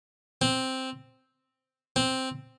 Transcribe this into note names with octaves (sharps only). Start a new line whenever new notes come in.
C4
C4